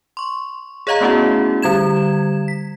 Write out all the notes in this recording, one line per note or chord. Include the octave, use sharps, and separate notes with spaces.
C6 C#6
G#4 C#5 D#5 F5 A#5
A3 B3 C#4 E4 F#4 G#4
D3 G3 G#6 E7
B6